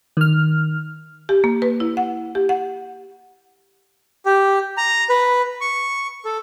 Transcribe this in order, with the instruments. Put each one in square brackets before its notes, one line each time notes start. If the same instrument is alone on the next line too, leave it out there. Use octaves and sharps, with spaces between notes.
[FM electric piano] D#3 F6
[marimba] G4
A#3
B4
E4
F#5
G4
F#5
[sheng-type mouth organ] G4
A#5
B4
C#6
A4